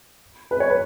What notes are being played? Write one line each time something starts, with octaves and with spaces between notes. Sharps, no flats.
B4
C#5
B4